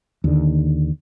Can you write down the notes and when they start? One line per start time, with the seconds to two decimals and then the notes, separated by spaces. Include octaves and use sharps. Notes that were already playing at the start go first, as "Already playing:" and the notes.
0.24 D#2 D3